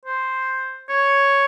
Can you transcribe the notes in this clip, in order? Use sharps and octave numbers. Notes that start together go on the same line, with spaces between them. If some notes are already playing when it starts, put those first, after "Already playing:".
C5
C#5